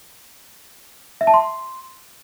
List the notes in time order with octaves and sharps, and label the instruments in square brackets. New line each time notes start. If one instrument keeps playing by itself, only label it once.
[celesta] E5
A5
C6